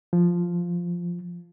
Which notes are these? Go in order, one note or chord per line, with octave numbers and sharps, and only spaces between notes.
F3